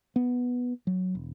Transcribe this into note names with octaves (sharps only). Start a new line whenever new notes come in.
B3
F#3
E1